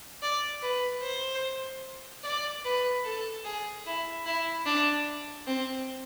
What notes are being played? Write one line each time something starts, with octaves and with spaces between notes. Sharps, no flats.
D5
B4
C5
D5
B4
A4
G#4
E4
E4
D4
C4